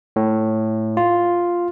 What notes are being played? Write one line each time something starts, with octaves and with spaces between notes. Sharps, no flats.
A2
F4